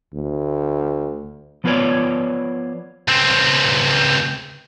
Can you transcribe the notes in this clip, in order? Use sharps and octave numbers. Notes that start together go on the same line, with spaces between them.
D2
F3 B3 F4 B4 C#5 D5
C#2 C4